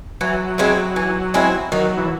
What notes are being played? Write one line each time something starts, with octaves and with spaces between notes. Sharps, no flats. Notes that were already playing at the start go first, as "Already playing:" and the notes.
E3 F#3
G#3 C4 E4
E3
G#3 C4 E4
D#3 F#3
E3